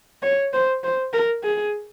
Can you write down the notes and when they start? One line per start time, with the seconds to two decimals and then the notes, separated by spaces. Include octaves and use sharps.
0.22 C#5
0.53 C5
0.84 C5
1.13 A#4
1.43 G#4